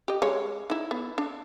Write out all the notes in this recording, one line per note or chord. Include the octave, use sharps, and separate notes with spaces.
G4 D#5
G#3 C#5
D#4 E4
B3
D4